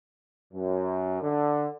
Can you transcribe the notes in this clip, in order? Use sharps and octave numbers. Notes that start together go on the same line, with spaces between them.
F#2
D3